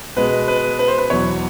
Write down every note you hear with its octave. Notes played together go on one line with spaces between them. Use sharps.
B2 G#3 B4
B4
B4
C5
B4
E2 B2 F#3 C#5